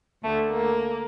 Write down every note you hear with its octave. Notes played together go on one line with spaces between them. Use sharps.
D2 D3 A3
A#3